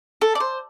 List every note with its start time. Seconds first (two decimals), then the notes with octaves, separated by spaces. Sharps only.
0.21 A4
0.35 D5
0.40 C5